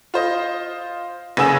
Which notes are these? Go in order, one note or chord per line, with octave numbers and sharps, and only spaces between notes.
F4 C5 D#5
F#1 C#3 B4 G#5 E6 E7